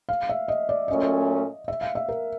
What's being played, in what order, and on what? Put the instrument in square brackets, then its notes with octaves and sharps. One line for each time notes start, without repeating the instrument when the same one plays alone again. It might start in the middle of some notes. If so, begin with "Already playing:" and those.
[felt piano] F5
E5
D#5
D5
[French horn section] A#2 F#3 A3 C#4 [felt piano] D#5
[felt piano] E5
F5
E5
A#4